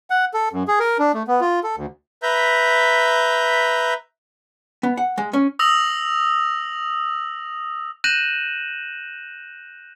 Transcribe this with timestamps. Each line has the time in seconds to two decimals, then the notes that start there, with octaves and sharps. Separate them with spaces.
0.10 F#5
0.34 A4
0.52 F#2
0.68 G#4
0.80 A#4
0.99 D4
1.14 A3
1.28 B3
1.41 F4
1.64 A4
1.76 D2
2.23 B4 E5 A#5 G6
4.83 B3
4.97 F#5
5.18 G#3
5.33 C#4
5.59 D#6 E6 A#6 F7 F#7
8.04 F#6 G6 A#6 D#7 E7 F#7